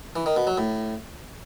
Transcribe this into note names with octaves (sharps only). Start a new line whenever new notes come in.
E3
D#3
B2
F#3
A2